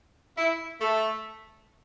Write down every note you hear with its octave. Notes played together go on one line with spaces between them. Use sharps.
E4
A3